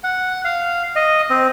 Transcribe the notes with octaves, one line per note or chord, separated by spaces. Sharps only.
F#5
F5
D#5
C4